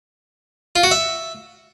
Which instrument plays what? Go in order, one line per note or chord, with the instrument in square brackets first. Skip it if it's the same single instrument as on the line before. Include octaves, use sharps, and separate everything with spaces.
[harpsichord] F4
F#4
E5